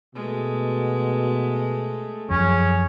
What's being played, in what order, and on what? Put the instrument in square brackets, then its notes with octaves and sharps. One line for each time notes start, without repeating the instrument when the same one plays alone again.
[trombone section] B2 [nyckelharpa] G#3 A3
[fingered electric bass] F#2 F3 [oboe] C#4 [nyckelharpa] G#4